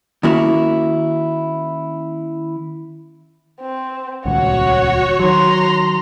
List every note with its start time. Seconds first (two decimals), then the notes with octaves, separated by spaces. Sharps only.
0.23 D#3 A#3 C#4 E4 F#4 A#4
3.61 C4
4.25 D#1 C#2 F#4 C#5 F#5
5.19 D#3 F#3 A#5 C6